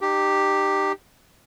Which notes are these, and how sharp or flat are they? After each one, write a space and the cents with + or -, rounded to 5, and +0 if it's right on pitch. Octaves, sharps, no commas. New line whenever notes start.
D#4 -40 G4 +0